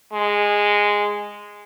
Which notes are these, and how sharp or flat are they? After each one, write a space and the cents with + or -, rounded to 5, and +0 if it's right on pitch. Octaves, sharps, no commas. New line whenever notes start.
G#3 -10